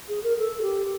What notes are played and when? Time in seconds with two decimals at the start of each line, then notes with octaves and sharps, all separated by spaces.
0.09 G#4
0.23 A#4
0.38 A4
0.62 G4